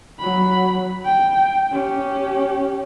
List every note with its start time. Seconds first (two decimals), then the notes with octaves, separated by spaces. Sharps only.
0.19 F#3 B5
1.05 G5
1.72 C#4 G4